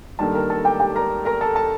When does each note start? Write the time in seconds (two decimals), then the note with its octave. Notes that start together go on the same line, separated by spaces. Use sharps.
0.19 G2 D#3 G3 A#3 A4 A5
0.34 A#4 A#5
0.50 A4 A5
0.65 G4 G5
0.80 G4 G5
0.95 A#4 A#5
1.25 A#4 A#5
1.41 A4 A5
1.56 A4 A5